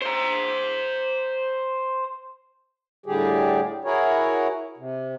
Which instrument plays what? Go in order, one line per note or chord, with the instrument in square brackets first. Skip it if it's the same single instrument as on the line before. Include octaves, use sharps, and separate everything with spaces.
[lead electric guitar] C5 A#5
[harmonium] A2 D3 G3 G4 G#4
E4 F#4 G#4 A#4 C#5
C3